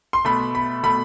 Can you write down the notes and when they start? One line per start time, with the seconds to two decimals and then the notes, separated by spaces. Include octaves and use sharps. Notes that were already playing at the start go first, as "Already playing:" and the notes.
0.13 C6
0.25 B2 A3 B5
0.55 B5
0.83 B2 A3 B5